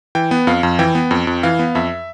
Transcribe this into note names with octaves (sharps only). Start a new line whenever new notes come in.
E3 G5
B3
F2 F5
F2
E3 G5
B3
F2
F2
E3 F5
B3
F2 E5